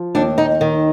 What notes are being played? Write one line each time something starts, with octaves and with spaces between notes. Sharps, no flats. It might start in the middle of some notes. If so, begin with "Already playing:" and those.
Already playing: F3
D#2 D4
D#4
D#3